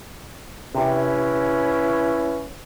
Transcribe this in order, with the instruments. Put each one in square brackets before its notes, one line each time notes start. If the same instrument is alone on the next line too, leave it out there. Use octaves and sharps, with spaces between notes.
[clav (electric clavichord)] C3 [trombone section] C#4 E4 B4